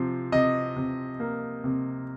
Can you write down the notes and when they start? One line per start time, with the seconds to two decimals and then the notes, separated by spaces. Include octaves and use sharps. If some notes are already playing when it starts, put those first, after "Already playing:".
Already playing: C3 F3
0.32 C3 D#5
0.76 C3
1.20 A#3
1.64 C3